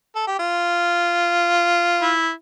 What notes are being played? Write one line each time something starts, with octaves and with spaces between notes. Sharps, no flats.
A4
G4
F4
E4